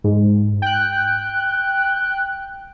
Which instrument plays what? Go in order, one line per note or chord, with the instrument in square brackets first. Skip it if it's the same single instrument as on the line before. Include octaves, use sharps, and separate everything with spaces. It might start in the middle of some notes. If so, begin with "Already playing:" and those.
[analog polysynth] G#2
G5 F#6